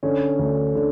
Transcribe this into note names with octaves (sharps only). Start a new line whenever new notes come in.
D3 C#4
D2
D3